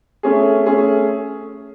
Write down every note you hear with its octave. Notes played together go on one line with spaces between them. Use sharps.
A3 C#4 G#4
A3 C#4 G#4